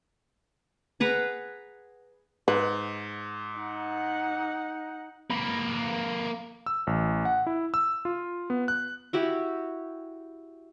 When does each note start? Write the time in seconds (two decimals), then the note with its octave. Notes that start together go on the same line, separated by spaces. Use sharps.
1.00 G#4 B4 F#5 A#5
2.48 G#2 B4
3.59 D#4 F#5
5.31 A#3 B4
6.66 E6
6.87 A1
7.25 F#5
7.47 E4
7.74 E6
8.05 F4
8.50 B3
8.68 F#6
9.13 E4 F#4 G4